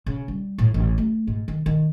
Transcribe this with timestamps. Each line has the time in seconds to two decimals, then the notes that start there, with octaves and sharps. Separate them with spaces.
0.06 C#3
0.28 G3
0.58 A2
0.74 A1
0.98 A3
1.27 G#2
1.48 D#3
1.66 D#3